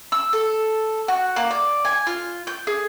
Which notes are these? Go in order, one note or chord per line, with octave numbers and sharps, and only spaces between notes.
E6
A4
F#4
A#3
D5
G#5
F4
G6
G#4